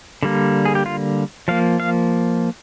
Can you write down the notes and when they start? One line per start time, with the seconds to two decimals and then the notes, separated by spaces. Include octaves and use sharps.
0.23 D3 G3 A#3
0.65 G#4
0.75 G4
0.86 F4
1.48 F3 A#3 F5
1.80 F5